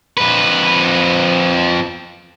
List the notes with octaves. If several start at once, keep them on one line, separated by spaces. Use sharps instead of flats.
F2 B4